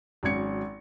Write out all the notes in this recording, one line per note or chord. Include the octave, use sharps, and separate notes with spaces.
G#1 F#3 C#4 G#6 C#7